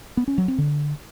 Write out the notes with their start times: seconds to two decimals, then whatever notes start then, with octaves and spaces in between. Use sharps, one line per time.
0.17 B3
0.28 C#4
0.38 F#3
0.48 C4
0.58 D3